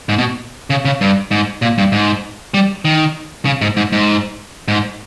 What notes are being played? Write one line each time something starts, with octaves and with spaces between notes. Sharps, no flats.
G#2
B2
C#3
C#3
G2
G#2
A#2
G2
G#2
G3
D#3
C#3
G#2
G#2
G#2
G#2